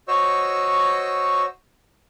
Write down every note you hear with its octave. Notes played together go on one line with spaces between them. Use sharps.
F#4 C5 C#5 D#5 C#6 E6